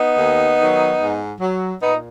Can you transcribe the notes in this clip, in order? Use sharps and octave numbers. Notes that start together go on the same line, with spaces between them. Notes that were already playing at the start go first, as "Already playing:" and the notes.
Already playing: B3 D#4
D#2
D#3 F#3
G#2
F#3
A#2 B3 D#4